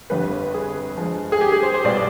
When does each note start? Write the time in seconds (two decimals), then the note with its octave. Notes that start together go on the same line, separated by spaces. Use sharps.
0.10 G1 F2 D3 G3 B4
0.54 G#4
0.97 G2 F3 G#3
1.32 G#4
1.41 G4
1.52 G#4
1.63 C5
1.74 C5
1.84 B1 B2 G3 B3 D5